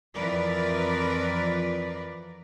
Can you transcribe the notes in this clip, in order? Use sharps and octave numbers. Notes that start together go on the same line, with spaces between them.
F2 E3 F3 A#4 B4 D5